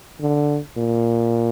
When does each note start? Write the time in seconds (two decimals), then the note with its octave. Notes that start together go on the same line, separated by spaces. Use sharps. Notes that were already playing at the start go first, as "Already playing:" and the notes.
0.21 D3
0.77 A#2